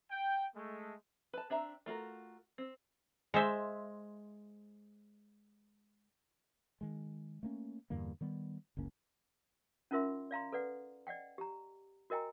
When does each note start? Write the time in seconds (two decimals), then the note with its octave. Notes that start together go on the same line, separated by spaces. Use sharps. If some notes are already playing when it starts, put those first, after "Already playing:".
0.11 G5
0.55 G#3 A3
1.33 B4 A5
1.50 C4 D4 E5 A#5
1.86 A3 F4 F#4 A#4
2.58 C4
3.34 G#3 C5 E5
6.81 D#3 G#3
7.43 A3 A#3 C#4
7.90 E2 G2 D3 A#3
8.21 D#3 G3 B3
8.77 F#1 C#2 A#3 C#4
9.91 C#4 D#4 F4 A#4 E5 C6
10.31 D5 F5 A#5 C6
10.52 A4 B4 D5 F#5
11.07 D5 D#5 F#5 G5
11.38 G4 A#5
12.10 F#4 A#4 D#5 G5 G#5 A#5